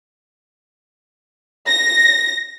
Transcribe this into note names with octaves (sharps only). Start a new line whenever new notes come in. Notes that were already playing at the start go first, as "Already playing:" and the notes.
A#6